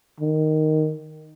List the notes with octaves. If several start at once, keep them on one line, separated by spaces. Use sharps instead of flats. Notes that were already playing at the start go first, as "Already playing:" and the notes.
D#3